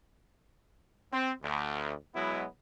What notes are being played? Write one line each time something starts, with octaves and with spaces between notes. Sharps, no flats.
C4
D2
B2 F#3 G#3 B3 E4